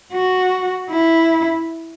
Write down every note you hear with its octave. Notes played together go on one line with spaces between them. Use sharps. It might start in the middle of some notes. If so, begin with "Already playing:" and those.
F#4
E4